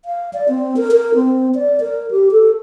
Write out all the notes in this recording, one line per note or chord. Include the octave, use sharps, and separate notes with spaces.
F5
D5
C4
A#4
A#4
C4
D5
A#4
G4
A4